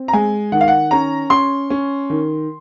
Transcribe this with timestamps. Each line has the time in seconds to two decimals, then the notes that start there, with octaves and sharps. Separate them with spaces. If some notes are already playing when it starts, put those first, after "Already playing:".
Already playing: C4
0.08 A#5
0.13 G#3 G#5
0.52 D#3 F#5
0.61 F5
0.68 F#5
0.91 C#4 A#5
1.30 C#4 C6
1.70 C#4
2.10 D#3